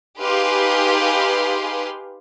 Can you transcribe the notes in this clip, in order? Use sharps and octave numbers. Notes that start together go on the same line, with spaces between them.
D#4 G4 G#4 B4 F5 C6